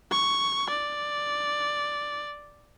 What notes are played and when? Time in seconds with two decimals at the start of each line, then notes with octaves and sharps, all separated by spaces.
0.11 C#6
0.70 D5